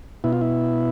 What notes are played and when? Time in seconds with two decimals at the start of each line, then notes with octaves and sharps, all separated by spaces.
0.24 B2 E4
0.33 F4
0.41 E4